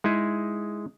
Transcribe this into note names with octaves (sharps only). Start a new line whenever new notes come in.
G#3 D#4 E4 G#4